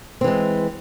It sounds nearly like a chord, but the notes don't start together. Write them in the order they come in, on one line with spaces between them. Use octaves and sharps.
C4 E3 G#3